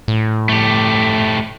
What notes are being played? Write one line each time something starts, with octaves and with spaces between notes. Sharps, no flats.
A2
A3 G4